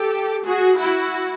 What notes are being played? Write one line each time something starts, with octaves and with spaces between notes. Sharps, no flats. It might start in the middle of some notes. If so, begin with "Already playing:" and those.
Already playing: G4 A4
F#4 G#4
E4 F#4